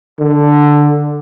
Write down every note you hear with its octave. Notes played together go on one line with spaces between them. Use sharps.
D3